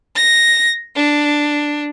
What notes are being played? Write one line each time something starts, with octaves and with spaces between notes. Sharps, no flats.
A#6
D4